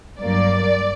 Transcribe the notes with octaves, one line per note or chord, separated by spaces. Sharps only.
G2 F#3 A#3 D5